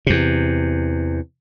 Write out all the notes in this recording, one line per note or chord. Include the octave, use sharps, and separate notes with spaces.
E2 C3